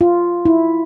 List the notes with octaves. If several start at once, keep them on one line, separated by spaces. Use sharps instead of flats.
F4
E4